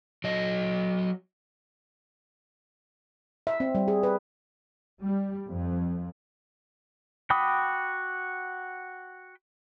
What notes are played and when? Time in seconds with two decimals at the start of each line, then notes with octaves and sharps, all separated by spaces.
0.24 F#3 D#5
3.47 E5
3.60 C4
3.75 G3
3.88 G#4
4.03 B4
5.02 G3
5.47 F2
7.30 F#4 G5 B5 D6 D#6